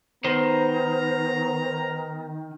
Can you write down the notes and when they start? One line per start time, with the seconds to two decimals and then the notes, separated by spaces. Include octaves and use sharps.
0.24 D#3 B3 C5 A#5